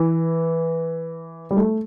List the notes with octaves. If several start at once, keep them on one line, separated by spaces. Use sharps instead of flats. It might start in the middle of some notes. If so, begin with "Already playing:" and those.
Already playing: E3
G3
A3